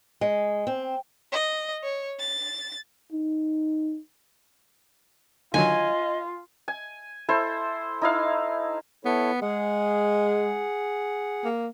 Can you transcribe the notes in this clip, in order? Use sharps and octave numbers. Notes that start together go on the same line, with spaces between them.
G#3
C4
D#5
C#5
A6
D#4
D3 D#3 F#3 F4 D#5 G#5
G#5
E4 A4 C5
D#4 E4 F5
B3 E4 A4 C#5
G#3 G#4 F#5
A#3